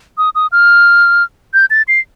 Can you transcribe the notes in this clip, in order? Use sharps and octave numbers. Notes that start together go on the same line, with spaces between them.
D#6
D#6
F6
G6
A6
C7